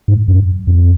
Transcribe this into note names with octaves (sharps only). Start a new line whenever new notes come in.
G#2
F#2
F2